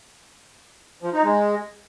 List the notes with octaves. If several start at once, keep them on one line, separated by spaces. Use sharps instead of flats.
F3
D#4
G#3